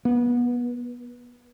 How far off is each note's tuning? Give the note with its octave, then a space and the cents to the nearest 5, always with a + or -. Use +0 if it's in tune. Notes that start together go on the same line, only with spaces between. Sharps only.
B3 -25